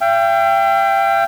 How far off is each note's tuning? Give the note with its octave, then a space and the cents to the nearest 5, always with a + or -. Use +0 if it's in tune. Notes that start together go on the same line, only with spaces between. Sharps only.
E5 +45 G5 +5